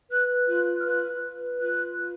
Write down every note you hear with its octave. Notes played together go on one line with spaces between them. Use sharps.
B4 F#6
F4 F#6
F6
B4 F#6
B4
F4 F#6
B4